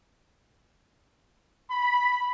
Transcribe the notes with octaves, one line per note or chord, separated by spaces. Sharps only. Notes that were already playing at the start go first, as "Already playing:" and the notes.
B5